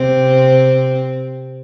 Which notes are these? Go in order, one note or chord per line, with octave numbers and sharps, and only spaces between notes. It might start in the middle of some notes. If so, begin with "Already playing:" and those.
Already playing: C3 C4